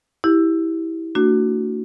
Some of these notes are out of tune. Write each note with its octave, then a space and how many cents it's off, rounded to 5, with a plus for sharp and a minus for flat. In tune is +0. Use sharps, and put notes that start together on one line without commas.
E4 -15 G4 +0
A3 +45 D4 +0 F#4 +0